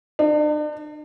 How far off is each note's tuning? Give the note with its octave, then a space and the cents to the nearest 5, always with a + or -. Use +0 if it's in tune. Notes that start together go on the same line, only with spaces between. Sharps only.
D4 +40